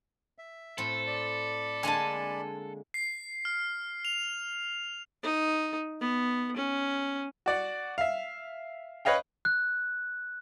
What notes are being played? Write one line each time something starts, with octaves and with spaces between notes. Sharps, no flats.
E5
A2 C4 A4
D5 B5
D3 G#3 A#3 G#5 A5
C7
F6
F7
D#4
B3
C#4
F#4 D5 F#5
E5 F5
B4 C#5 D#5 F5 G5
F#6